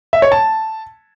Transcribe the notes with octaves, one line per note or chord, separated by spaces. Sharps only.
E5
C#5
A5